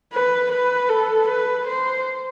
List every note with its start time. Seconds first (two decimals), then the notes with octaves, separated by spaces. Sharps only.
0.13 B4
0.51 B4
0.89 A4
1.28 B4
1.67 C5